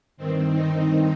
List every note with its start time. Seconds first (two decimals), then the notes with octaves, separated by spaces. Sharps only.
0.17 G2 D#3 C4
0.53 D#4